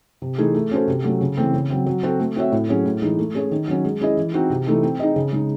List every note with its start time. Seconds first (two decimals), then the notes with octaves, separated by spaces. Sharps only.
0.22 C3
0.38 E3 A3 D#4 G#4
0.54 A3
0.71 C#4 F#4 A4 C5
0.88 C3
1.04 F#3 A3 C#4
1.21 C#3
1.37 E3 A3 C4
1.53 C#3
1.70 F#3 C4
1.86 F#3
2.03 C4 F#4 A4 C5
2.20 A3
2.36 C4 F#4 C#5 E5
2.52 A2
2.69 F#3 C#4 G#4
2.85 A2
3.02 E3 G#3 D#4
3.19 A3
3.35 C#4 G#4 C#5
3.51 D#3
3.68 F#3 C#4
3.85 G#3
4.01 C#4 E4 G#4 D#5
4.17 E3
4.34 C4 D#4 F#4
4.50 C3
4.66 E3 A3 D#4 A4
4.83 C4
5.00 D#4 G#4 D#5
5.16 C#3
5.32 G#3 D#4